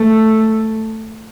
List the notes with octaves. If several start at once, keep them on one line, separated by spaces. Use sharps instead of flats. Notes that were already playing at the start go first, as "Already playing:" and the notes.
Already playing: A3